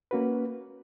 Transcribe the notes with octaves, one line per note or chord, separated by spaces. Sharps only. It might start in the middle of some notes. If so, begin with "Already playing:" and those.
A#3 C#4 F#4 B4